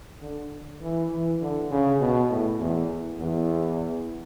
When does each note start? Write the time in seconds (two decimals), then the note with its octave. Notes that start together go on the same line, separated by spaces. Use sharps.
0.22 D3
0.81 E3
1.11 E3
1.41 D3
1.71 C#3
2.00 B2
2.30 A2
2.60 E2
3.19 E2